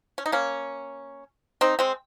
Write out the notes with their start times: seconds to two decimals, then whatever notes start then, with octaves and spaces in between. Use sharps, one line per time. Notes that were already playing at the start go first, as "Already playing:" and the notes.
0.18 C#4
0.26 D#4
0.32 A#3 C#4
1.61 C4 D#4
1.79 G#3 C4